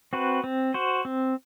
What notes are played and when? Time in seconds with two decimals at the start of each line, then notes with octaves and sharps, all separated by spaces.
0.13 C4 F#4 B4
0.44 C4
0.74 F#4 C5
1.05 C4